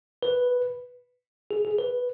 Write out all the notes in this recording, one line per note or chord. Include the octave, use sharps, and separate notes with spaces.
B4
G#4
G#4
B4